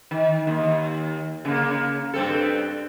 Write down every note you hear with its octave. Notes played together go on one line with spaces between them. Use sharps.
D#3
D#2
C#3 A#3
G2 C4 A4